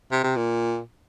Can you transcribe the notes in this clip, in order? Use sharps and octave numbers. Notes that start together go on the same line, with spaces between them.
C3
C3
A#2